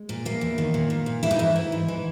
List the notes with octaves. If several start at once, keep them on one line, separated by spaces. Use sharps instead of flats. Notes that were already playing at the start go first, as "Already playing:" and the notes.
Already playing: G#3
A#2
E2 A#3
E2
D#3
A#2
A#2
A#2
E3 E4
D#4
G#2 E4
E3
G#2
E3